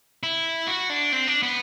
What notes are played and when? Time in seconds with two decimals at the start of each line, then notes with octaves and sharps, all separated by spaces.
0.23 E4
0.68 F#4
0.90 D4
1.12 C4
1.28 D4
1.43 B3